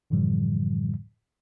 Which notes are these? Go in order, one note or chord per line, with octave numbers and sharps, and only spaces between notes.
F#2 A2 D3 E3 F3 G3